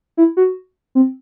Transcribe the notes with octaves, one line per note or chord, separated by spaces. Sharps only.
E4
F#4
C4